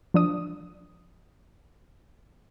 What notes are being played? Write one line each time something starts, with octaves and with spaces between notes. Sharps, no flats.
F3 D4 D#6